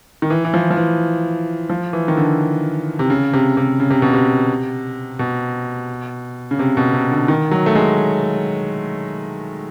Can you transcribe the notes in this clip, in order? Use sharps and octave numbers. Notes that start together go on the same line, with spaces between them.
D#3
E3
E3
F3
F3
E3
F3
E3
D#3
D3
C3
C#3
C3
C3
C#3
C3
B2
C3
B2
C#3
C3
B2
C3
D3
D#3
F#3
A3
G#3